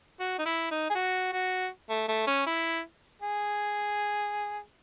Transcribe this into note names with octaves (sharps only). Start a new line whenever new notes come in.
F#4
D#4
E4
D#4
G#4
F#4
F#4
A3
A3
C#4
E4
G#4